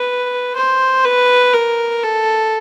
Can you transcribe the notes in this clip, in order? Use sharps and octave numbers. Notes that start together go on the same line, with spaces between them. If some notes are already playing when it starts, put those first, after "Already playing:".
Already playing: B4
C5
B4
A#4
A4